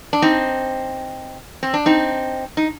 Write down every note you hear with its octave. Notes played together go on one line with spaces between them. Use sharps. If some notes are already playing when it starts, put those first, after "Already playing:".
D4
C4 D#4
C4
D4
C4 D#4
D#4